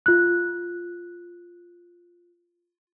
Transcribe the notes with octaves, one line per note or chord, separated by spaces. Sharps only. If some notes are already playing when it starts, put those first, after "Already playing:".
F4 F#6